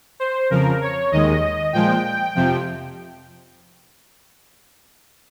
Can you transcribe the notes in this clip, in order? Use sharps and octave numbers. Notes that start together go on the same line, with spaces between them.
C5
F2 C#3 F3 A#4
C#5
D#2 D#3 G#3 D#5
A#2 F3 G#3 G5
F2 C3 F3